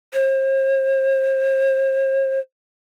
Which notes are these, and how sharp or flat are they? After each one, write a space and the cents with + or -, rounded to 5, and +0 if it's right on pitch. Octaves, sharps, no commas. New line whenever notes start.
C5 +40